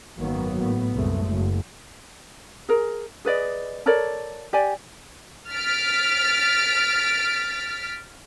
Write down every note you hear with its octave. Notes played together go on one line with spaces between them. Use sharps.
G#1 F#2 D#3 F#3 A#3 B3
A2 B3
C2 F#2 G#3 A3
F#1
G#4 A#4
G#4 B4 D5 D#5
A4 A#4 C#5 D5
G4 D5 G#5
F6 A6 B6 D7